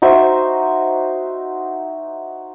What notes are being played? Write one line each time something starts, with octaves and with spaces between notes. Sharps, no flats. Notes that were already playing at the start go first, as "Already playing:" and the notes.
D#4 F#4 C5 E5